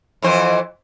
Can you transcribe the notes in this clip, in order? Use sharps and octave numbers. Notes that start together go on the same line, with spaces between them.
F2 E3 C5